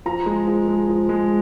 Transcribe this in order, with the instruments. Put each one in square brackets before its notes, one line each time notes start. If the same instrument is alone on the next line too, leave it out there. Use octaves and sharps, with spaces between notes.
[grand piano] F3 A#5
G#3
F3
G#3
F3
G#3